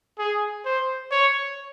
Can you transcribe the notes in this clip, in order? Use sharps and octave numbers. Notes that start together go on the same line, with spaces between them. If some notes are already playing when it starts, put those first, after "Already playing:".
G#4
C5
C#5